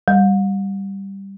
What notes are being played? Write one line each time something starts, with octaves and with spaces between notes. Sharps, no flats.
G3